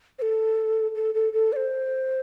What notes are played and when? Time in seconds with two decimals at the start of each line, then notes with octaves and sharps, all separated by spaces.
0.19 C5
0.22 A4
0.95 A4
1.15 A4
1.33 A4
1.53 D5
1.56 C5